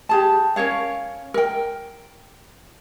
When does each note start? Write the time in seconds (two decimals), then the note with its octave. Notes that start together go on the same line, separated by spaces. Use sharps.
0.09 G4 G#4 A5
0.56 C#4 A#4 C#5 F5
1.34 A#4 G5